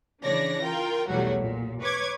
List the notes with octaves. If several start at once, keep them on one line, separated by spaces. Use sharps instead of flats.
C#3 E3 D4 C#5 D5 A#6
F4 A#4 G5
B1 E2 F#3 G3 A3 F#4
A#2
B4 C#5 C#6 D6 G#6